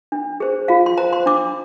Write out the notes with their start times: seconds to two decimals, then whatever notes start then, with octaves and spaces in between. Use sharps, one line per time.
0.12 D4
0.40 G#4 C5
0.68 F4 F5
0.86 C6
0.98 C5 A#5
1.13 C6
1.26 D4 D6